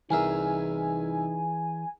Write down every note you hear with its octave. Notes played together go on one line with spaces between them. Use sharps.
C2 E3 D#4 G#4 A#4 E5 G#5